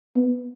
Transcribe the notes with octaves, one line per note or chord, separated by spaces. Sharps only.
B3